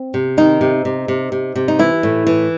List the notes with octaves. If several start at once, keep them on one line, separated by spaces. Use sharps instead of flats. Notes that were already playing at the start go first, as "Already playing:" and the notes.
Already playing: C4
C3
D#3 D#4
C3
C3
C3
C3
C3
D#4
E3 E4
A2
E3